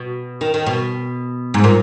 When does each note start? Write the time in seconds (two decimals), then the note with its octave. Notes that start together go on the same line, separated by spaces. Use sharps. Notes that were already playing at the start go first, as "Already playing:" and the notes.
Already playing: B2
0.41 D#3
0.54 D#3
0.66 B2
1.54 G#2
1.64 A#2